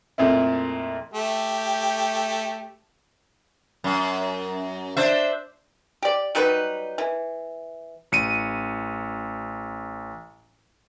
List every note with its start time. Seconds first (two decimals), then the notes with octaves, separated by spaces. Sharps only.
0.18 F2 A#2 A3 E4
1.14 A3 G4
3.84 F#2
4.97 D4 C5 E5
6.03 G4 D5
6.35 F#3 G3 D#4 B4
6.98 E3
8.12 A1 C#7 D#7